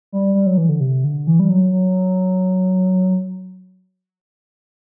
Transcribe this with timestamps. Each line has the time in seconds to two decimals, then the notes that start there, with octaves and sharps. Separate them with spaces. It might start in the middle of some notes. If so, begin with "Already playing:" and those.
0.12 G3
0.35 G3
0.46 F#3
0.57 E3
0.69 D3
0.81 C3
1.04 D3
1.27 E3
1.40 G3
1.50 F#3
1.73 F#3